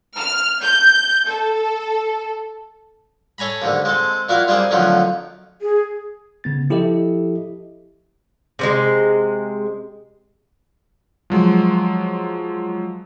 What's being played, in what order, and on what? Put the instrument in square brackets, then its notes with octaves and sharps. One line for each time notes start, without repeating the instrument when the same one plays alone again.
[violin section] F6
G6
A4
[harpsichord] A4 C#5 G#5 A#5 B5
D#2 G#2 D3
G#3 C4 A4
A#2 E4 F#4 F5 C6
G3 A#3 C4 D4 G#4 C5
F2 D3 D#3 F3 F#3 A3
[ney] G#4
[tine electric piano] C#3 B3 A6
F3 E4 G4 A4 D#5 E5
[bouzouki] C3 F3 G#3
[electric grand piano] F3 F#3 G#3